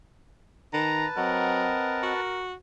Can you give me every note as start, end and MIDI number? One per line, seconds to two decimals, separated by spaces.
0.73 1.06 51
0.73 2.20 71
0.73 2.20 81
0.73 1.07 82
1.17 1.72 54
1.17 2.13 60
1.17 2.43 70
1.17 2.13 75
1.17 2.13 78
2.03 2.54 66